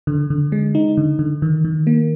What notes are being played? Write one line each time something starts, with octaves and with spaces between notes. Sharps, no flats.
D3
D3
G#3
D#4
D3
D3
D#3
D#3
A#3